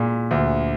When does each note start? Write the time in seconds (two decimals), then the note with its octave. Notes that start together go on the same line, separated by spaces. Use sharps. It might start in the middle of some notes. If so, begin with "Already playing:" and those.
Already playing: A#2 G#3
0.31 D2